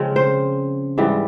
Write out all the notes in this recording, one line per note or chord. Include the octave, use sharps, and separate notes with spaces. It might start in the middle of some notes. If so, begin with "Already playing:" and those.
Already playing: C#3 F3 G#3 C4
C5
G#2 E3 G3